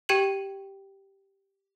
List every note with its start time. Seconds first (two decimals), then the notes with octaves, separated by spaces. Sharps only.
0.09 G4 G5 G#6 C#7 E7 F#7